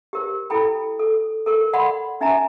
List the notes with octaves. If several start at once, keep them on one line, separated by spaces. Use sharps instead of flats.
G4 A#4 C5
E4 A4 G5 B5
A4
A4 A#4 C#6
D5 F#5 B5 C6 D6
C#4 D#4 E5 G#5 A#5